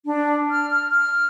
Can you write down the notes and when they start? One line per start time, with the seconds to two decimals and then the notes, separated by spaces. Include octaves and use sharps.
0.05 D4
0.51 F6
0.71 F6
0.91 F6